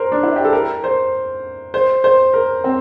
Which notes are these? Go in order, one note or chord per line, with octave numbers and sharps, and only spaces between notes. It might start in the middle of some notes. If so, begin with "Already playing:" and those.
Already playing: A#4 C5
D4
E4
G4
A4
A#4
C5
C5
C5
A#4
C4